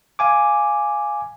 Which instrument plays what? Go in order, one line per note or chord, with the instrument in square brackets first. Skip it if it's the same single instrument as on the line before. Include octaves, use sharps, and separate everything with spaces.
[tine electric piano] F5 G#5 D6